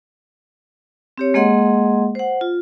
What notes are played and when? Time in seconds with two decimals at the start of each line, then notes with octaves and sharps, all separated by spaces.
1.18 C4 G4 C#5
1.34 G#3 A#3 G#4 D#5 F#5 C6
2.15 C5 F#5
2.41 F4